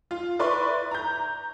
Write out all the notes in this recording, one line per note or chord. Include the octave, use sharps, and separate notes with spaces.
F4
E4 B4 D5 C6 C#6
A#5 G6